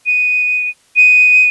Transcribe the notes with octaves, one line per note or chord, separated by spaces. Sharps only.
D#7
D#7